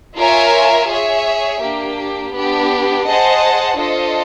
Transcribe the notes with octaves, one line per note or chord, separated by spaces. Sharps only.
F4 A#4 C#5 E5 G#5
G#4 C#5 E5
A#3 D4 G4
B3 D4 G4
G#4 C5 D#5 F#5 A5
D4 F4 A4 C5 D#5